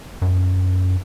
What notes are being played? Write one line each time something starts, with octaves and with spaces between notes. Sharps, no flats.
F#2